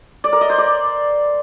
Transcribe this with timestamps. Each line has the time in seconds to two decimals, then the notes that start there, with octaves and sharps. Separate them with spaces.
0.24 D5
0.33 A#4
0.41 D#5
0.50 C5
0.58 D5